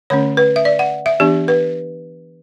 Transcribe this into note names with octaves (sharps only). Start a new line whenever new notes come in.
D3 A3 C#4 C#5
B4
E5
D5
F#5
E5
E3 B3 D4 G4
B4